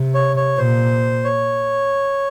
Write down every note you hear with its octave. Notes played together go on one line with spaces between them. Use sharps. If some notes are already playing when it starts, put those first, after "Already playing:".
Already playing: C3
C#5
C#5
A#2 C5
C#5